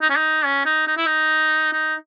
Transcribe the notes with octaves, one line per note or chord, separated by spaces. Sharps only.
D#4
C#4
D#4
C#4
D#4
D#4
E4
D#4
D#4